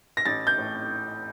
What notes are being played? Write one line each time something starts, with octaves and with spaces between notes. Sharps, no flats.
A#6
A1 A6
G6
A2